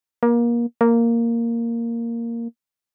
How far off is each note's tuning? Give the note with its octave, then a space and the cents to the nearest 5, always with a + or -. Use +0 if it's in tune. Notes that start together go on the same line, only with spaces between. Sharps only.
A#3 +25
A#3 -5